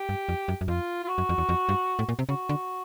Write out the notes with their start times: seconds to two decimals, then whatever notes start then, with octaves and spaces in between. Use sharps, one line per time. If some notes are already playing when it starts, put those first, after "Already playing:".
Already playing: G4
0.09 G2
0.29 F2
0.48 F#2
0.61 F#2
0.68 F2 F4
1.04 F4
1.08 F#4
1.18 F#2
1.29 F2
1.38 E2
1.49 F2
1.69 G2
1.99 A2
2.09 A#2
2.19 C3
2.29 C#3 F#4
2.49 D3